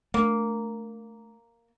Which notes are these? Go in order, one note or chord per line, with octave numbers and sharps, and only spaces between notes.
A3 A#3 D4